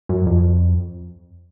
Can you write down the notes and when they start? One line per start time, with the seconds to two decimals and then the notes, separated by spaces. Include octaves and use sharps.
0.09 F#2
0.27 F2